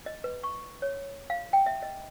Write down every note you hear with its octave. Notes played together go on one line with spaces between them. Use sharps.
D#5
B4
C#6
C#5
F5
G5
E5
D#5